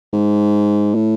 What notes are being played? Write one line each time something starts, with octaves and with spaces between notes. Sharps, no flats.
G#2
A2